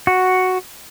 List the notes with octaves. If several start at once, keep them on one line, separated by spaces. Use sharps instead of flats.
F#4